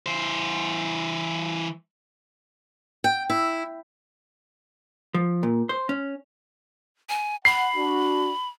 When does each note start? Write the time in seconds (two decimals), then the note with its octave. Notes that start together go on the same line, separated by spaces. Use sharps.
0.06 E3 C5
3.04 G5
3.30 E4
5.14 F3
5.43 A#2
5.69 C5
5.89 C#4
7.09 G#5
7.45 F#5 B5 C7
7.75 D4 F#4